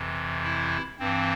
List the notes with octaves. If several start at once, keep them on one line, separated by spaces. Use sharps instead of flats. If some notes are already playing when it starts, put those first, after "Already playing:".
Already playing: F2 C3 E3
E4
G2 E3 C4